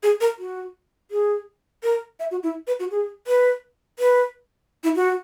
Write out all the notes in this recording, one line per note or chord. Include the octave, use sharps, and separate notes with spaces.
G#4
A#4
F#4
G#4
A#4
E5
F#4
E4
B4
F#4
G#4
B4
B4
E4
F#4